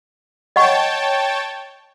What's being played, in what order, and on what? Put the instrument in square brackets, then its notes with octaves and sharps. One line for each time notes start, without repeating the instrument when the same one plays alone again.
[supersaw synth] C#5 G5 A5 [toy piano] D#5 F#5 C#6